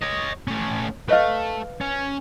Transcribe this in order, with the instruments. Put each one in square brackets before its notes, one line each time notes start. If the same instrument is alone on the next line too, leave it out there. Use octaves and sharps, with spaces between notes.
[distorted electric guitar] C#5 D#5
A3 C#4
[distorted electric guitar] A3 [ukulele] B4 D#5 F5
[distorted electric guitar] C#4